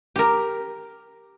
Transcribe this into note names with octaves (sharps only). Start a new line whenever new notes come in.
G4 A#4